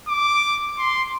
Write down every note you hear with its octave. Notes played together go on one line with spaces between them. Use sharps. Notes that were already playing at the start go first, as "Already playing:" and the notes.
D6
C6